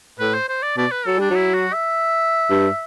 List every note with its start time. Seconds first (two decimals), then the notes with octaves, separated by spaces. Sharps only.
0.19 A2 B4
0.34 C5
0.49 C5
0.62 D5
0.77 B2 D5
0.91 B4
1.06 F#3 A4
1.18 G3 D4
1.30 F#3 E4
1.54 F#4
1.73 E5
2.50 G2